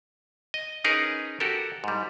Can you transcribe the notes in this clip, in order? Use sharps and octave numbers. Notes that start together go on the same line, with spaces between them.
D#5
C#4 D#4 G#4 A#4 B4
F#4 G4 A4 A#4
G#2 G3